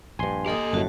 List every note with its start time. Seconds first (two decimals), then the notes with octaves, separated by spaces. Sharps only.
0.19 A#1 G2 G#5 C6
0.46 A#3 G4 A4 D#5 D#6
0.73 G1 F#2 A2 F#4 A5